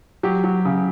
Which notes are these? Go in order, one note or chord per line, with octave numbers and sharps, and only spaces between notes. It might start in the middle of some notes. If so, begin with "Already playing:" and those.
F#3 G4
F#3
C#3